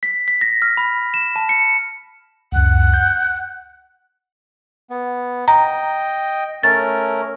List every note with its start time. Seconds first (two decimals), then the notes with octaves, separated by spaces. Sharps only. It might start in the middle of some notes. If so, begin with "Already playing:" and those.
0.03 B6
0.28 B6
0.41 A#6
0.62 F6
0.77 B5
1.14 E7
1.36 A5
1.49 C#7
2.52 C#2 F#2 F#5
2.94 G6
4.90 B3
5.48 D#5 G5 A#5
6.63 A3 C#4 A#4 A6